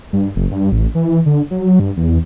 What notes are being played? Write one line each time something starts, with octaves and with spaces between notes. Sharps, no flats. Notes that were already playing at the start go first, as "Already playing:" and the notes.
G2
F#1
G2
A1
E3
D3
F#3
G2
E2